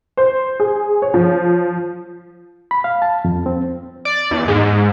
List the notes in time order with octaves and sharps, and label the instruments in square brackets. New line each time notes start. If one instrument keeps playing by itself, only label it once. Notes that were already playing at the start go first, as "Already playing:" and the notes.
[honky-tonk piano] C5
G#4
C#5
F3
[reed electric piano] B5
F5
A5
F2
C4
[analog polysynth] D5
E2
G#2